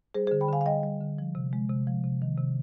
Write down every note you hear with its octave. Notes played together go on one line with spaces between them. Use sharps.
G3 G#4 C5
G#4 C5
D3
G5 B5
D3 F5 G#5
F5
G3 D#5 G5
G3
D3
F3
C3
G#3
C3
F3
C3
D#3
C3